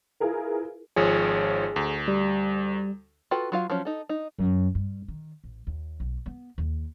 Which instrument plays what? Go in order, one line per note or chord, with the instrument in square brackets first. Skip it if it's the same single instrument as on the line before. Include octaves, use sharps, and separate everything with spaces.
[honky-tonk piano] E4 F4 G#4 A#4 B4
[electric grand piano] G#1 F3 C#5 [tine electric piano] G#4
[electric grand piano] D2
[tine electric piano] G3
[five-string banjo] F4 F#4 A4 B4 G5
F#3 F4 F5
F3 F#3 C#4
D#4 A4
D#4
[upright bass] F#2
G2
D#3
A1
D#2
B1
B3
D#2